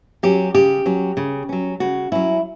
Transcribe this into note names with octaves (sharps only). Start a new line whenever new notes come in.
F#3 C#4 G4
C#3 G4
F#3 C#4
C#3
F#3 C#4
C#3 F#4
F#3 C#4 E4